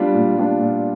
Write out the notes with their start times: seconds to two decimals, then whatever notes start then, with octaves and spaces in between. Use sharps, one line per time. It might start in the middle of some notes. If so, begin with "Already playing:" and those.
Already playing: G3 B3 D4 F4
0.14 A#2
0.37 G3 B3 D4 F4
0.61 A#2